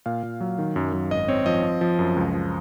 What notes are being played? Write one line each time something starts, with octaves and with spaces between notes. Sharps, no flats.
A#2 F5
A#2
F#3
D#3
F#2
F#2
G#1 D#5
C4 C#5
F3 D#5
C4
F3
F#2
C#2
F3